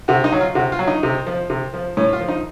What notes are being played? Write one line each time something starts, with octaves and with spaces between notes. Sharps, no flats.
C3 F#4
D#4
F#3
F4
C3 F#4
F4
F#3
D#4
C3
F3
C3
F3
A2 C#4
F4
F3
D#4